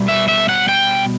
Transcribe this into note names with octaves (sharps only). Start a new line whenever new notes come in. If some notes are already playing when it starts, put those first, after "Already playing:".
Already playing: B2 G3 B3
E5
E5
F#5
G5